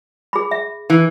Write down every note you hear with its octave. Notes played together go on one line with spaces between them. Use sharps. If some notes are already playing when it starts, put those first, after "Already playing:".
G#4 B5
E5
E3